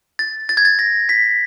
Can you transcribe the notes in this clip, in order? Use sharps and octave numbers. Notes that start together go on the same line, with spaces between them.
A6
A6
G#6
A6
A#6
B6